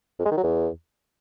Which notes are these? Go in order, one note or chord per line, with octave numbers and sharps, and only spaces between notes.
F2
G#3
D#3
F#3
E2